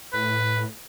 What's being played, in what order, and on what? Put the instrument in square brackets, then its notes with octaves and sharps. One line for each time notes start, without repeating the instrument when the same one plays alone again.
[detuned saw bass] A2 [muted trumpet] B4